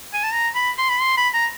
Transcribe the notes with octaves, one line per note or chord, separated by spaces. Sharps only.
G#5
A5
A#5
B5
C6
B5
C6
B5
A#5